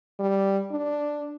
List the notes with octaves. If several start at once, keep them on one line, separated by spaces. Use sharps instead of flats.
G3
D4